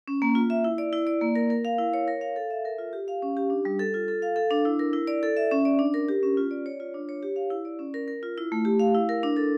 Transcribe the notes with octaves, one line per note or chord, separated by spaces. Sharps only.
C#4
A#3
F4
E5
E4
D5
E4
D5
A#3
A#4
A#4
F5
E4
C#5
A#4
F5
A4
E5
A#4
F4
G4
F5
C#4
G4
D4
G3
A4
F4
A4
F5
A4
D4
E4
A#4
E4
D5
A4
E5
C#4
D5
D4
A#4
G4
C#4
F4
D5
C#5
F4
D4
C#5
G4
F5
E4
D5
C#4
A#4
A#4
F4
E4
A3
G4
F5
E4
A#4
D4
A4